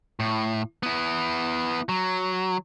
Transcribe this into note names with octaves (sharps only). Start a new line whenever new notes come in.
A2
B3 E4
F#3